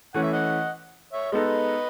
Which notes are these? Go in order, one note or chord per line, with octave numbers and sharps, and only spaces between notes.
E3 A3 C#4 F#5
E5
D#5 F#5
C#5 E5
G#3 B3 D#4 A4 B4 D#5